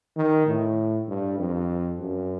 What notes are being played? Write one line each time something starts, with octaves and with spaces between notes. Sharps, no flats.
D#3
A2
G2
F2
F#2